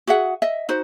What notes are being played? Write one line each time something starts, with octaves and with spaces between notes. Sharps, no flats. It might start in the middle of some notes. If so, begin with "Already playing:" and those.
F#4 G#4 E5 F#5
D#5 E5
D#4 F#4 C5